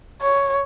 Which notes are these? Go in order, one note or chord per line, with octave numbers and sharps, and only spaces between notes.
C#5